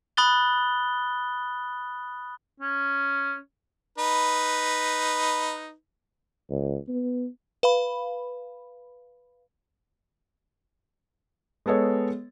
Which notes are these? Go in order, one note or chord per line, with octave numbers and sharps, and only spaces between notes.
B5 D#6 F#6 A6 G7
C#4
D#4 B4
C#2
B3
B4 F5 B5
G#3 B3 A4 C#5 D#5